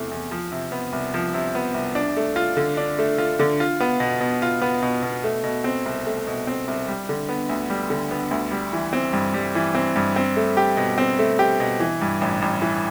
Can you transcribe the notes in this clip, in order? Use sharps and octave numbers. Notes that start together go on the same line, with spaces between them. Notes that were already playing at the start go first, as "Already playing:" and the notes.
Already playing: E2 C3 E3 A3
E2
F3
C3
B3
C2
F3
C3
B3
C2
D4
A3
F4
D3
D4
A3
F4
D3
F4
B3
B2
B2
F4
B3
B2
B2
A3
B2
C4
C2
A3
B2
C4
C2
G3
D3
B3
D2
G3
D3
B3
D2
G3
E3
C4
G2
G3
E3
C4
G2
C4
A3
G4
B2
C4
A3
G4
B2
E3
G2
A1
A1
E3